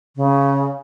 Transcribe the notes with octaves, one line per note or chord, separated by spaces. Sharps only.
C#3